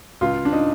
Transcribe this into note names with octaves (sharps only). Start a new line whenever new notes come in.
C#2 F4
D4
D#4